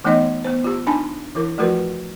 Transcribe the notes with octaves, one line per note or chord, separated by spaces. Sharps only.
E3 A3 B3 D#4 C#5 D#5
B3 C5
F4 G4
D4 D#4 G#5 A5 B5
E3 E4 A#4
F3 A3 F4 F#4 A#4 B4